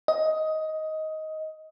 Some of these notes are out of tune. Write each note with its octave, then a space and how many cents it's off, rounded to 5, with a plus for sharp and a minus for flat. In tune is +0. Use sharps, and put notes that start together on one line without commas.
D#5 +15